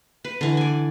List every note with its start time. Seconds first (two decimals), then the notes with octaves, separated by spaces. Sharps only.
0.25 B4
0.41 D3 E3
0.57 D5 G#5